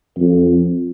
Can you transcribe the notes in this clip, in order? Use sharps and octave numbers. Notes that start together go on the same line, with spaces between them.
F2